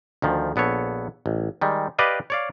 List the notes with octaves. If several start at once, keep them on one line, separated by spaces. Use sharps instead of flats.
D2 D#3 F3
A#1 B3 A4 C#5
A1
D#3 G3 G#3
G4 B4 D5 D#5 F5
C#5 D5 F5